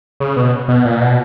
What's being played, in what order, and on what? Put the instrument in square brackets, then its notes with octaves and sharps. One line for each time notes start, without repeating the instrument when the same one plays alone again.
[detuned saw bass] C#3
B2
B2
A#2
B2